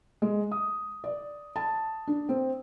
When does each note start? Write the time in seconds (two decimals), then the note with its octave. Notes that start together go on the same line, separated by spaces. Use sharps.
0.22 G#3
0.51 D#6
1.04 D5
1.56 A5
2.07 D4
2.29 C4